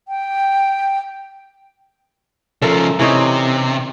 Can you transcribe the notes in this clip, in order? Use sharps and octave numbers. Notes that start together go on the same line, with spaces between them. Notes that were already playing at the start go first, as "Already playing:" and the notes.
G5
C#3 F3 A4 A#4 E5
C3 E3 C#4 D#4